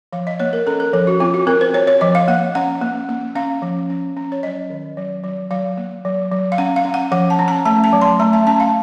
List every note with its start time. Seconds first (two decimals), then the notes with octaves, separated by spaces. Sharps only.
0.13 F3 F5
0.27 D#5
0.40 A#3 C#5
0.53 A#4
0.67 C#4 A4
0.80 A#4
0.93 F3 A4
1.07 F#4
1.20 C4 F4
1.34 F#4
1.47 C4 A#4
1.61 C5
1.74 C4 C#5
1.87 C#5
2.01 F3 D#5
2.15 F5
2.28 A#3 F#5
2.55 C#4 F#5
2.81 A#3
3.09 A#3
3.35 C#4 F5
3.62 F3
3.90 C#4
4.17 C#4
4.32 C#5
4.43 F#3 D#5
4.70 D#3
4.97 F#3
5.24 F#3
5.51 F#3 F5
5.77 A#3
6.05 F#3
6.32 F#3
6.52 F5
6.58 C#4 F#5
6.76 F5
6.85 C#4
6.94 F#5
7.12 F3 F#5
7.30 A5
7.39 C#4
7.48 A#5
7.65 A3 A5
7.84 A5
7.93 F#3
8.01 C6
8.19 A3 A#5
8.33 A5
8.47 C#4 A5
8.60 F5